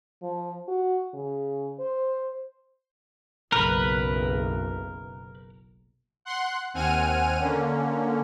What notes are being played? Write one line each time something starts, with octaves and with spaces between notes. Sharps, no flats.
F3
F#4
C#3
C5
F#1 B1 A#4 B4 B5
F#5 C6 F#6
D#2 C4 F#5 G#5 F6 D#7
D3 A#3 C#4